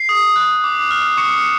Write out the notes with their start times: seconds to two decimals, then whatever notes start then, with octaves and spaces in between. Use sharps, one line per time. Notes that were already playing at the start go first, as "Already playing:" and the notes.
Already playing: C7
0.09 D#6
0.36 F#6
0.64 D6
0.91 F6
1.17 C#6 C#7